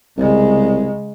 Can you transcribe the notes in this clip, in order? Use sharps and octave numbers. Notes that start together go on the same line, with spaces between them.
C2 C#3 G#3